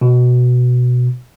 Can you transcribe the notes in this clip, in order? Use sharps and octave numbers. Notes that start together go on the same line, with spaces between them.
B2